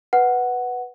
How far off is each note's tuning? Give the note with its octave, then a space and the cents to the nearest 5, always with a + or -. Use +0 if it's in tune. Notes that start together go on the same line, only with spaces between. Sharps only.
B4 +0 F#5 +0